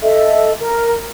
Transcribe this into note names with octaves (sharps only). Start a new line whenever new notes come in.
A4 D#5 E5
A#4